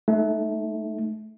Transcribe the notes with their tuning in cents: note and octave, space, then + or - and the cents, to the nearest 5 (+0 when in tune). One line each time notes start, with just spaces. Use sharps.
A3 -20 D#4 +0